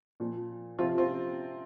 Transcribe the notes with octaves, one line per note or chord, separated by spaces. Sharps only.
A#2 F3
C3 F3 C4 F4
C4 F4